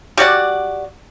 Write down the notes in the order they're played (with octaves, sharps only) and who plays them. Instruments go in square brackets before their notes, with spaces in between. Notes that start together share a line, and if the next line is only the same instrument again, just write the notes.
[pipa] G3 F#4 D5 F#5